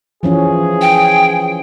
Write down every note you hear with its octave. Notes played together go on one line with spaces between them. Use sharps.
E3 F3 C#4 G#4
G5